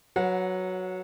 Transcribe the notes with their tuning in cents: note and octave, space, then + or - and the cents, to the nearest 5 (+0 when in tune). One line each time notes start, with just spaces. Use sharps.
F#3 +0 B4 +0 F#5 -25